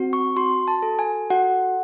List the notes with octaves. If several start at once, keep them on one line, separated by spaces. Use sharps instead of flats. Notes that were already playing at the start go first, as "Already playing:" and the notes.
Already playing: C4 F#4
C#6
F#4 C6
A5
A4
G#5
F#4 F#5